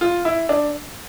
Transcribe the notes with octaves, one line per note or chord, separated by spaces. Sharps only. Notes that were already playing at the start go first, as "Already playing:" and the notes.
F4
E4
D4